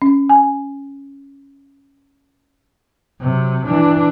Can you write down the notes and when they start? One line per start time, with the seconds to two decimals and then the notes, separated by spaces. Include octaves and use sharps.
0.02 C#4
0.29 G#5
3.21 C3 F#3
3.65 E3 D4